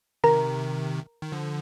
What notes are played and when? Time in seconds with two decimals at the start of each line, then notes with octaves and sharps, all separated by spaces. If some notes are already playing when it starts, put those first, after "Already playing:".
0.24 C3 D#3 A#4 A#5
1.22 D#3
1.32 D3 F3